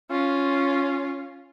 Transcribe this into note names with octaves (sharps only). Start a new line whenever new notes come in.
C#4 F4